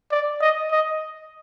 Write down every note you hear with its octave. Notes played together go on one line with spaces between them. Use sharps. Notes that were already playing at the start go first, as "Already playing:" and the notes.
D5
D#5
D#5